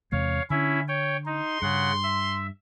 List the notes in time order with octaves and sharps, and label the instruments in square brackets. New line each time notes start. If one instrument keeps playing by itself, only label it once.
[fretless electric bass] E2 C3 G#3 [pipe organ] C#5 F5
[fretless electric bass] D3 [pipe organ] C#4 E4 E5
[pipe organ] C#5 G5
[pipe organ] D#4 [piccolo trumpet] C6
[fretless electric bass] G2 [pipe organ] C#3 F#5
[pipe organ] E5